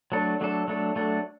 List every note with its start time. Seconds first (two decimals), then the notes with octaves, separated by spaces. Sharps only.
0.12 F#3 A3 D4 A4
0.41 F#3 A3 D4 A4
0.68 F#3 A3 D4 A4
0.96 F#3 A3 D4 A4